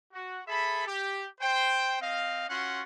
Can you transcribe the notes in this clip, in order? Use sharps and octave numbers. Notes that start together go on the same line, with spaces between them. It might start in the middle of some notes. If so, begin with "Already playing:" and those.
F#4
G#4 A4 E5 B5
G4
C5 G5
C4 D#5 F5
C#4 F4 F#4 F#5 C6